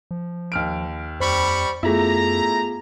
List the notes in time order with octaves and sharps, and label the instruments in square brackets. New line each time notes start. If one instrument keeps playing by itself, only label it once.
[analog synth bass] F3
[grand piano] D#2 F6 D7
[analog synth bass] F2 [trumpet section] G3 B5 C#6 [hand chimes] C5
[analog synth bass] F#2 [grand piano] A3 E4 [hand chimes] B3 F4 G#4 [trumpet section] A#5